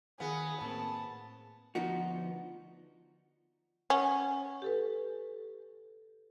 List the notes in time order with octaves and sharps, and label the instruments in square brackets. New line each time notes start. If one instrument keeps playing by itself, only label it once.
[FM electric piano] D#3 F5 [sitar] B3 [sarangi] G#4
[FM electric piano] A2 A#3 C4 [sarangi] A5
[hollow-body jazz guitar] D2 F3 B3 D#4 F#4
[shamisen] C#4 [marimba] F#5 G#5
[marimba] G4 A4 B4